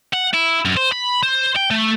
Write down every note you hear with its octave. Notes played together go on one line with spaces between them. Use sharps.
F#5
E4
F#2
C5
B5
C5
G5
A3